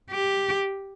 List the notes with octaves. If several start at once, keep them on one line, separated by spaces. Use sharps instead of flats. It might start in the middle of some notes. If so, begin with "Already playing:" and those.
G4